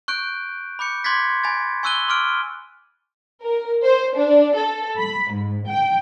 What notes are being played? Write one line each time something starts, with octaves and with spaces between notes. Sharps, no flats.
C#6 F#6 G6 D7
B5 D6 G6 C#7
C6 D6 F#6 G#6 A6 B6
G#5 B5 A6
G#5 C#6 E6 F#6 D#7 G7
C6 D6 F6 D7
A#4
C5
D4
A4
B5
G#2
G5